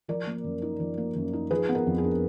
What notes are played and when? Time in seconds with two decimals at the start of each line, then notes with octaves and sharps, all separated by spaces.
0.08 F3 A#4 D5
0.27 A#3
0.44 F#2
0.62 D#4
0.80 F3
0.98 A#3
1.16 F#2
1.33 D#4
1.51 F3 G#4 B4
1.69 B3
1.75 A#4
1.87 F2
1.98 G#4
2.04 D4